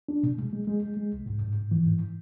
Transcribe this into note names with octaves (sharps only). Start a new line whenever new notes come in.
D4
B2
G#3
G#3
G#3
G#3
G#3
C2
G#2
G#2
G#2
E3
G#2